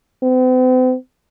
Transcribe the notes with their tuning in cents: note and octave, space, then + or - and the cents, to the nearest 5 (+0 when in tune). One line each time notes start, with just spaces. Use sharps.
C4 -45